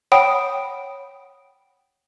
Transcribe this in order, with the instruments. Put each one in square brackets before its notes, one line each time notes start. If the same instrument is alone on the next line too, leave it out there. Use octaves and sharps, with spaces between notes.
[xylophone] C#5 F#5 G5 B5 D#6 D7